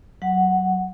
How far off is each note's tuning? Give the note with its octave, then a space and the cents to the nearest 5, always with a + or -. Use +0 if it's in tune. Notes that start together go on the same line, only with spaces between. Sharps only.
F#3 +20 F#5 +0